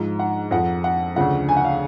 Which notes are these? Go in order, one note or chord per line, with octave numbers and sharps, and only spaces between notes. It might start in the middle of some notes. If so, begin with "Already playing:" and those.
Already playing: G#2 F3
F#5
F2 F3 F#5
F#5
D2 C#3 F3 F#5
G#5
F#5
F5